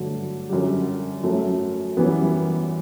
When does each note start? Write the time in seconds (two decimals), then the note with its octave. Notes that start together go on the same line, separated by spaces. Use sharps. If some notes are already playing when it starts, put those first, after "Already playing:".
Already playing: G2 D3 F#3 A3
0.49 F#2 D3 F#3 G3
1.23 F#2 F#3 A3
1.97 F#2 E3 G3 B3